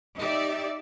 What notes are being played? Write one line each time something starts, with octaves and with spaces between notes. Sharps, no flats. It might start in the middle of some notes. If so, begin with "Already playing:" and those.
D#4 G4 D5 E5